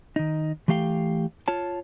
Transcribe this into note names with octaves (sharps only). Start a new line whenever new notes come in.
D#3 D#4
E3 A3 G4 F5 G5
F4 C#5 A5